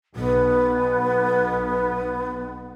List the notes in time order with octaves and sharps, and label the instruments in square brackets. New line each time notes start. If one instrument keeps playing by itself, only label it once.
[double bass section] B1 [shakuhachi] B3